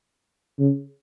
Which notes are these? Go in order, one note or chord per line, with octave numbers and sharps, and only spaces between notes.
C#3